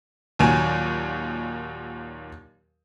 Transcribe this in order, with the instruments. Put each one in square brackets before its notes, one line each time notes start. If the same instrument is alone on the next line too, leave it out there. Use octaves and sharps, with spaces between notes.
[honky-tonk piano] D#2 A#2 D#3 F#3 G#5 E7